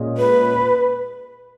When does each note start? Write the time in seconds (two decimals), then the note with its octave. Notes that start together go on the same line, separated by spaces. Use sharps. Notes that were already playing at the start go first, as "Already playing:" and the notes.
Already playing: A#2 G#3 C#4 G#4 D#5
0.18 B4